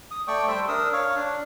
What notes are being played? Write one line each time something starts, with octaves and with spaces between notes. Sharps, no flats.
D#6
A3 D5 G5 C#6
G3 C5 E5 G5
D4 A#4 D#6 E6
C#5 F5
D4